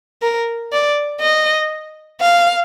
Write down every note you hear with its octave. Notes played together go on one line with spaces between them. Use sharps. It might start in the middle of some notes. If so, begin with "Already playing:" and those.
A#4
D5
D#5
F5